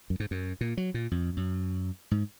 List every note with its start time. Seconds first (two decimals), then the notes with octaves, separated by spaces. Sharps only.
0.10 F#2
0.20 G#2
0.31 F#2
0.61 A#2
0.77 F#3
0.94 A#2
1.11 F2
1.37 F#2
2.11 G#2